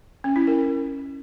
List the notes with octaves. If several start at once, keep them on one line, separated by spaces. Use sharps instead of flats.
C#4
E4
A#4